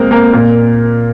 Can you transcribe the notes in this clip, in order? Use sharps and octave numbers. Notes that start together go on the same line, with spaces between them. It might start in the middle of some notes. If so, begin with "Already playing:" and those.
Already playing: G#3 A#3 C4 A#4
A#3 A#4
A#2 A#3